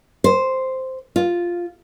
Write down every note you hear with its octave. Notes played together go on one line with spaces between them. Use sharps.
C5
F4